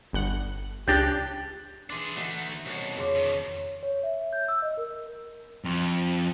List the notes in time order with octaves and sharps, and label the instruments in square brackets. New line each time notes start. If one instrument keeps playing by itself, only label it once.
[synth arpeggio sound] G1 F#5
[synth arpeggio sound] C#2 D4 F#6 [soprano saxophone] G4 [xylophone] G6 A6 A#6
[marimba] E3 C6 D6 [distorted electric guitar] D4 G#4 [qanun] A4 B4
[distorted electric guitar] D3 A3 [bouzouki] D#4 F#4
[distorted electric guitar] C2 B2 [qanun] C#4 A5 A#5
[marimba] F2 C6 D6 [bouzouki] C#3 [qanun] F#3 C#5
[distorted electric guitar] B2 D#3
[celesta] C#5
E5
G6
E6
D#5
A#4
[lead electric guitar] F2